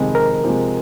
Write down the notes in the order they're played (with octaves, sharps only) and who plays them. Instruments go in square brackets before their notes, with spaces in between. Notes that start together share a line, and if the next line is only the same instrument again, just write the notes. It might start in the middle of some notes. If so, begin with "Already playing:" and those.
Already playing: [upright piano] F2 C3 D#3 G#3
[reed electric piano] A#4
[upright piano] C3 F3 G#3